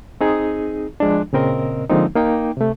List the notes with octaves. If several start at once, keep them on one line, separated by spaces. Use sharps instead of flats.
C4 D#4 G#4
F3 G#3 D4
A#2 C#3 C4 A#4 D#5
D3 F3 G#3 A#3 C4 D#4
A#3 D#4 G5
C3 A3